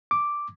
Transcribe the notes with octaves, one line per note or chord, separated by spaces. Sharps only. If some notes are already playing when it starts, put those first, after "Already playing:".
D6